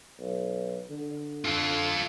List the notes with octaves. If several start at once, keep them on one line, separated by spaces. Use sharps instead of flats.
B1
D3
F4 A4